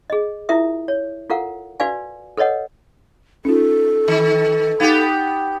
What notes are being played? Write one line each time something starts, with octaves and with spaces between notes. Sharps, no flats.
G#4 D#5
E4 F4 A#4 E5 D#6
C#5
F4 A4 A#4 F5 F#5
F#4 B4 D5 F5 G#5
A4 B4 C#5 D#5 F#5
C#4 D#4 F4 A4
D#3
B3 D#4 G4 F5 G#6